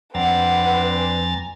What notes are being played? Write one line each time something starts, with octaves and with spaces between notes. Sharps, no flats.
F2 C4 D4 B4 F#5 A#5 A6
G#5